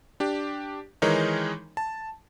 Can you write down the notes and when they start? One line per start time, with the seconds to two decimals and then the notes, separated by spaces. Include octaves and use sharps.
0.20 D4 G4
1.02 D#3 E3 G#3 D#4 A#4 C#5
1.77 A5